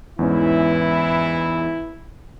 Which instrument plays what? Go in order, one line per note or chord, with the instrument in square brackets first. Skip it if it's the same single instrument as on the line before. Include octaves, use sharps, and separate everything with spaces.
[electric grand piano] E2 G#2 C#4 [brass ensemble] E3 E4